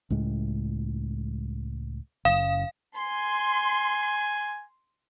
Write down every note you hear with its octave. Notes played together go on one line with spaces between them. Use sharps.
C#2 A2 G#3
F#1 F#2 F5
G#5 C6